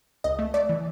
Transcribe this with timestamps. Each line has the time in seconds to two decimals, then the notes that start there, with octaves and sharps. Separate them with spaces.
0.24 C#2 D#5
0.39 A3
0.54 A3 D5
0.69 E3